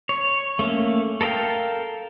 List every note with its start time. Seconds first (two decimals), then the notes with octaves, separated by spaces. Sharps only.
0.09 C#5
0.59 A3 A#3 C#4
1.21 A4 A#4 D#5 F5 G5